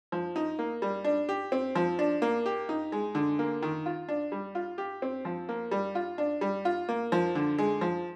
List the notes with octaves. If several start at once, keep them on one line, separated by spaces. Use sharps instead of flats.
F3
D#4
A#3
G3
D4
G4
C4
F3
D4
A#3
G4
D#4
G#3
D3
A#3
D#3
F4
D4
G3
F4
G4
C4
F3
A#3
G3
F4
D4
G3
F4
A#3
F3
D3
G#3
F3